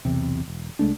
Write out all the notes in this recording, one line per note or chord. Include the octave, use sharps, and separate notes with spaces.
B1 E2 C3
E1
C2 G#3 A3 D4